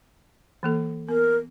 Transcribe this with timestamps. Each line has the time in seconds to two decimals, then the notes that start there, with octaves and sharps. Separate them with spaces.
0.63 E3 A#3 A4
1.09 B3 A#4